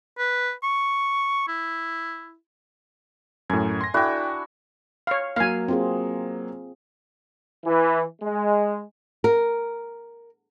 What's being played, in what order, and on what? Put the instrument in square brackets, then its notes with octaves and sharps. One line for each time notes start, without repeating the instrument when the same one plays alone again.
[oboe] B4
C#6
E4
[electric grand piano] F#2 A2 [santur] G#5
[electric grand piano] C6 A#6
[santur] D4 E4 F#4 [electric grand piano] A4 G5
[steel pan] C#5 F5
[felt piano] F#3 A#3 [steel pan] F5 G#5
[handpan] C4 F4 G#4
[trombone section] E3
G#3
[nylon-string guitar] A#4